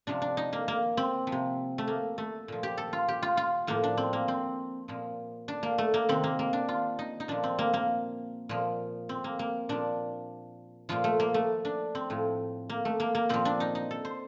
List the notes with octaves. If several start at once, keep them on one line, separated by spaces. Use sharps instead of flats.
C3 F3 D4
D4
D#4
A#3
A#3
C4
F3
C3
A3
A#3
A3
A#2 F3
G4
A4
F4
G4
F4
F4
A2 F3 A#3
D4
C4
A#3
C4
A#2 F3
D4
A#3
A3
A#3
C3 D#3 C4
A#3
A#3
D4
F4
D#4
D#4
A#2 F3 D4
C4
A#3
A#3
A#2 F3
C4
A#3
A#3
A#2 F3 D4
A#2 F3 F4
A3
A#3
A3
D4
C4
A2 F3
A#3
A3
A#3
A#3
A#2 F3 C4
D4
D#4
D#4
A4
C5